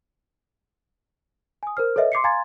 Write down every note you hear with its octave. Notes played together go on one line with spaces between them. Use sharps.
G#5 D#6
A#4 C5 F6
A4 B4 C#5 D#5 E5
C6 D6 C7 C#7
F5 G#5 A#5 C6 G#6 A6